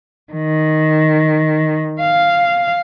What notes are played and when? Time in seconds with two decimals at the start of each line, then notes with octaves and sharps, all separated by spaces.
0.33 D#3
2.01 F5